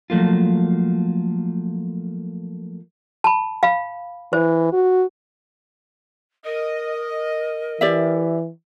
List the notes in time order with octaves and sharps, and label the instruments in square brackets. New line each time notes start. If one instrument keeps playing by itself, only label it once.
[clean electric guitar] F3 F#3 A3 A#3 F4
[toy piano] A5 B5
F5 B5
[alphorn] E3 [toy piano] C5
[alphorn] F#4
[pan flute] A#4 [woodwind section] D#5
[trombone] E3 [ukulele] G4 D5 E5